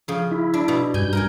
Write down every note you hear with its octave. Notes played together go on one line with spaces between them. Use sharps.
C#3 F3
E4
D4
B2 B3
G2 G#5 G6
A#4 G5 G#5